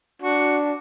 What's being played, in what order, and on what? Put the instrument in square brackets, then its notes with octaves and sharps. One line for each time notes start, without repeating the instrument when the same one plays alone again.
[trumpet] D4 [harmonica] F#4